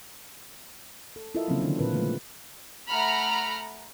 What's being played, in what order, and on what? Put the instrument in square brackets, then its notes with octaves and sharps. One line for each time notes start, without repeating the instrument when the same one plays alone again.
[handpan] A4
E4 F4 A4 A#4 D#5 E5
C#3 F3 F#3 A#3 C4 C#4
D3 D#3 D4
A#2 C4 F4 A#4 B4
D3 F3 G#3 A3 B4
[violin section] A3 F#5 A#5 B5 F6